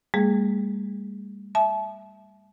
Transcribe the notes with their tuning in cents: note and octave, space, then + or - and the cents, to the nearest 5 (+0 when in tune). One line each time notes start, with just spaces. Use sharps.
G3 +35 A#3 -40 G#4 +0
E5 +0 A5 -35